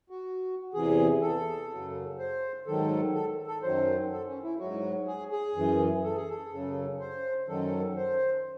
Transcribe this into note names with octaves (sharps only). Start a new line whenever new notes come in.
F#4
E2 C3 E3 G#4
A4
F#2 C#3 F#3
C5
G#2 D#3 F#3 A4
A4
A4
F#2 D#3 F#3 C5
A4
C#4
E4
G#2 F#3 F#4
G#4
G#4
F#2 E3
A4
G#4
A4
F#2 C#3 F#3
C5
F#2 D#3 F#3 A4
C5